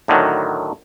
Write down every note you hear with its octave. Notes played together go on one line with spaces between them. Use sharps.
A2 D3 D#3 F#3